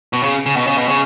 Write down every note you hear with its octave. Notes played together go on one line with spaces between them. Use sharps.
B2
C#3
C#3
B2
C#3
B2
C#3